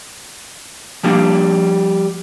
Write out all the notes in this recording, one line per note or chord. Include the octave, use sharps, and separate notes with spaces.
F3 G3 A#3 D4